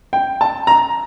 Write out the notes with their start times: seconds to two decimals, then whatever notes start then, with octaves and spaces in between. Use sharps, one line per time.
0.13 G5
0.41 A5
0.67 A#5